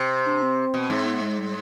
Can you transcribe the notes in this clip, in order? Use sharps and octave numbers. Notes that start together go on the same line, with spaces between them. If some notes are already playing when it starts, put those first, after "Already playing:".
Already playing: C3
D4
C4
B2
G#2
B3
G#3
G3